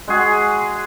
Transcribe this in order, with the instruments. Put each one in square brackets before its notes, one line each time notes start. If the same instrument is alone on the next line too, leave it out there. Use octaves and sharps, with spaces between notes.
[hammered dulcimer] G#3 F#4 G#4